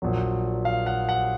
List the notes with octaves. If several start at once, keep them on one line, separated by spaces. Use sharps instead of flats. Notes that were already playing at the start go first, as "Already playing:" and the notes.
A#1 A#2 F#3
F5
F#5
F#5